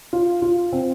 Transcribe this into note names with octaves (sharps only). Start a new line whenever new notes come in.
F4
F4
C4